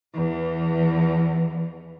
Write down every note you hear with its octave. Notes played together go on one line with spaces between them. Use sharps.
E2 E3